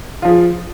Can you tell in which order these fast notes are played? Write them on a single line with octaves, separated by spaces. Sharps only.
F4 F3 G#4